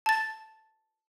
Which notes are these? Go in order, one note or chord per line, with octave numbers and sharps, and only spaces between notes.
A5 A6